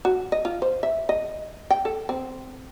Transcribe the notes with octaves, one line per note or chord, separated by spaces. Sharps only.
F#4
D#5
F4
C5
E5
D#5
G5
A4
C4